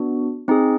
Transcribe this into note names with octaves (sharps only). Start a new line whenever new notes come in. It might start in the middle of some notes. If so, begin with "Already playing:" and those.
Already playing: B3 D4 F#4
C4 D#4 G#4